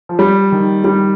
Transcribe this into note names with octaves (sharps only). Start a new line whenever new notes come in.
F3
G3
D#3
G3